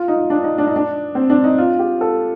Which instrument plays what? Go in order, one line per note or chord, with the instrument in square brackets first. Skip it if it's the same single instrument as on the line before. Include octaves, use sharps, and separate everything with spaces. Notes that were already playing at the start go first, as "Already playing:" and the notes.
Already playing: [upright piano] F4
D#4
D4
D#4
D4
D#4
D4
C4
D4
D#4
F4
G4
A4